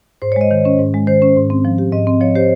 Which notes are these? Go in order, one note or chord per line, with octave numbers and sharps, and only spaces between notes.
G#2 C5
C#5
G#3 D#5
D#3
C#4
G#2
G#3
D#3 C5
C#4
G#2
C4
F3
G4
G#2 D#5
C4
F3 C#5
G4 C5